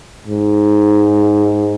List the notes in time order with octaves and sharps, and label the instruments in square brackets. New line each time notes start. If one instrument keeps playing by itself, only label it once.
[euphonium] G#2